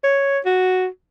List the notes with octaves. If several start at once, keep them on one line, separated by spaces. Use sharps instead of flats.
C#5
F#4